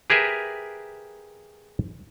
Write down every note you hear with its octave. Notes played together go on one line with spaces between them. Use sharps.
G4 G#4 A#4 B4 E5